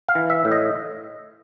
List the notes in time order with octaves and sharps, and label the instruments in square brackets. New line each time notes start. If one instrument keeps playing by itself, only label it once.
[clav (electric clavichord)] F5
E3
E5
A2
D#5